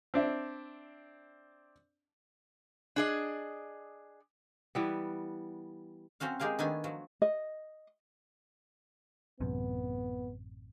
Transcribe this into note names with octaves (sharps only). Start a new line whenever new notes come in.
C4 D4 E5
D4 G#4 D#5
E3 G3 B3
F#3 C4 C#4 F#4 F5
G#3 G4 G#4 A#4 F5
D#3 A3 B3 D4 E4 G#5
F3 F#3
D#5
A1 F#2 C3 B3